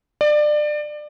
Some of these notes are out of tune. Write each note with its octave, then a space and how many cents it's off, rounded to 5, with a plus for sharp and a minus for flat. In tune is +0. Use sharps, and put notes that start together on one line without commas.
D5 +25